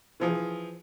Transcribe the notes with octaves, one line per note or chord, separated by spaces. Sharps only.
E3 F3 G#4